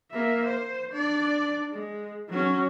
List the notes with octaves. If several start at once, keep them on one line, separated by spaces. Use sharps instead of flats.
A#3 E5
C5
D4 D5
G#3
F#3 C#4